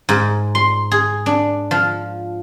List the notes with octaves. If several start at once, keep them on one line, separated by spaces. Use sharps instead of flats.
G#2
C6
G#4
D4
F3